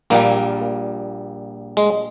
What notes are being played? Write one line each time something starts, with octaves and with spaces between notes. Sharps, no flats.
A#1 A#2 G3 A#3
G#3